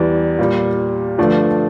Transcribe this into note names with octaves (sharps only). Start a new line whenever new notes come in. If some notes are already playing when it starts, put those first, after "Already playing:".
Already playing: E2 E3 G3 D5
A#2 G3
G2 D3 F3 A3 D5